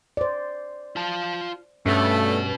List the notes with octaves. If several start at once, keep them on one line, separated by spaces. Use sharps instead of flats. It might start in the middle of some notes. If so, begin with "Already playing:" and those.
C5 D5
F4 A5
G2 B2 A3 B3 C#4